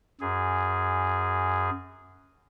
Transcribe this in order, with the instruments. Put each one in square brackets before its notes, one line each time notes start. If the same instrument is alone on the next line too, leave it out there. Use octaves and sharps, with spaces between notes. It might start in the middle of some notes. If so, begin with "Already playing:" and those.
[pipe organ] F#2 G#4